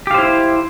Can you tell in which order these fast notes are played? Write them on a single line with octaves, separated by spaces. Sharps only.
G4 F5 C5 E4